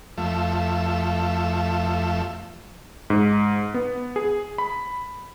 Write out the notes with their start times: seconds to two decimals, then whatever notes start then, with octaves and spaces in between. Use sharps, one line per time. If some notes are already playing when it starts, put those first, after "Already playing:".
0.18 F2 F3 A3 E5
3.10 G#2
3.74 B3
4.16 G#4
4.58 B5